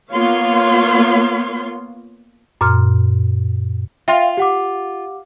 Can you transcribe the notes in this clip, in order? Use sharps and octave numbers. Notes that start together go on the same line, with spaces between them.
A#3 B3 F4 C#5 F5 C6
F#2 A#2 C6 F6
F4 E5 G5 C6
G4 F#5 D6